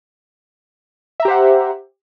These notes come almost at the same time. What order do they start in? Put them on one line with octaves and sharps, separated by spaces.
E5 A#5 G4 C5 F#5